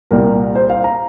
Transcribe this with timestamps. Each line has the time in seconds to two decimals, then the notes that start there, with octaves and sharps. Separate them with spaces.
0.11 C2 A#2 G3 A#4
0.55 C5
0.70 F5
0.84 A#5